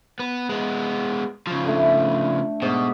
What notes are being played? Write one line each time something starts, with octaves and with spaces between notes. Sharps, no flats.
B3
G#3 B3
C#3 F3
D3 A3
G#2 B2 D5